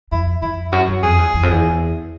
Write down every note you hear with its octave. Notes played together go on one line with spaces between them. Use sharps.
F2 E4
F2 E4
F#2 F#4
F#2
F2 G#4
E2
E2
F2
E2